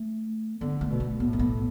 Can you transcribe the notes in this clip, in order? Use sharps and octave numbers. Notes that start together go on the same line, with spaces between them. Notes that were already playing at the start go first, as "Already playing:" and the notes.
Already playing: A3
D3 B3
A3
B2
A3
A2 B3
A3
B3